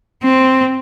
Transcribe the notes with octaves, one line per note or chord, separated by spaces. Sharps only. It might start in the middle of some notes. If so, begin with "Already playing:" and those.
C4